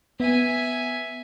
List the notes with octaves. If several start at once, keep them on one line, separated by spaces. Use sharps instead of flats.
B3 E5 G#5